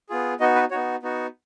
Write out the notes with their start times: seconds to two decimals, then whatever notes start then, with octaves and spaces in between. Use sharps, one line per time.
0.09 B3 F4 G#4
0.40 B3 D#4 F#4 D#5
0.55 B4
0.71 B3 D#4 F#4 C#5
1.02 B3 D#4 F#4